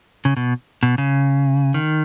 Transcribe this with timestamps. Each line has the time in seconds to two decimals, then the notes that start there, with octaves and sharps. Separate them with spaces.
0.25 C#3
0.37 B2
0.83 B2
0.98 C#3
1.74 D#3